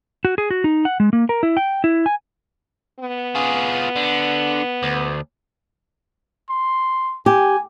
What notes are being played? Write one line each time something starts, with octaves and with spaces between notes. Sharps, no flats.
F#4
G#4
F#4
D#4
F#5
G#3
A#3
A#4
E4
G5
E4
G#5
B3
F4 G#4
D3
D2
C6
G4 G#5